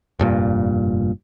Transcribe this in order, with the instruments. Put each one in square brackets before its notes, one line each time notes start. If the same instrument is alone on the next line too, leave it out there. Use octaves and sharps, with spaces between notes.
[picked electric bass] F1 G2 A#2